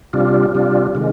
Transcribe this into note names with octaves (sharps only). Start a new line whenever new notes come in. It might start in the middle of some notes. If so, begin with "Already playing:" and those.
C3 G3 D4 F4
C3 G3 D4 F4
C3 D#3 G#3